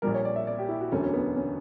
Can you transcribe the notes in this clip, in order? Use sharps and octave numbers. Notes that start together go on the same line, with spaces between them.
A#1 A#2 G3 A#4
C#5
D5
E5
D5
G4
E4
F#4
E1 D2 D3 F#3 C#4
C#4
B3
C#4